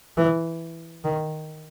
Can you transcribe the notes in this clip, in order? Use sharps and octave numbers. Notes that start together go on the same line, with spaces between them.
E3
D#3